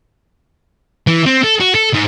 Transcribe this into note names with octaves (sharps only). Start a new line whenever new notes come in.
E3
C4
A4
F#4
A4
G#2